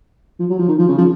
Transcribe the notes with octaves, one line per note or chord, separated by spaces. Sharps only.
F3
F#3
F3
D#3
F3
C#3
F3